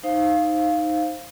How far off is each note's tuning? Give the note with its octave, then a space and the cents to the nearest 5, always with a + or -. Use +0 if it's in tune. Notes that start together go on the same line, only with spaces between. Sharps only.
D#4 +0 C5 +15 F5 +0